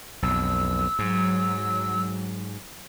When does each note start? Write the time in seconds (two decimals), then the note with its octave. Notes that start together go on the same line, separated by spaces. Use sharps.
0.22 B1 F2 E6
0.99 G#2 F#3